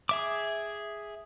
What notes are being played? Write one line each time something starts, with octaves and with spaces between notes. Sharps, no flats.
G#4 E5 D6